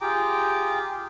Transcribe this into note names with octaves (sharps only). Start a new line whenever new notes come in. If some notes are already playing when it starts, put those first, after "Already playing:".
F4 G4 G#4 G5 A#5 D6